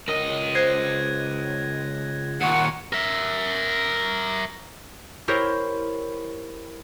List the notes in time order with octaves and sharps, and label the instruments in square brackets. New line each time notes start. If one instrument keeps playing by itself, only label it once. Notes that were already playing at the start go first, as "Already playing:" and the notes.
[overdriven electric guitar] C#2 D#5 [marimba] A#4
[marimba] C5 [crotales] F#6 G#6 A#6
[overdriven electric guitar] D#2 A#2 [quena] F#5 [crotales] C#6 C#7
[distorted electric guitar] A#4 E5
[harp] E4 G4 A#4 C5 C#5